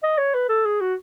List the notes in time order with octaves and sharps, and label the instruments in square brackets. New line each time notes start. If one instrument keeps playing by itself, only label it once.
[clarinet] D#5
C#5
B4
A4
G#4
F#4